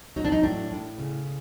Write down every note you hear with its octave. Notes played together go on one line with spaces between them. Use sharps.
F#3 D#4
D4
D#4
A2 D4
A2
C#3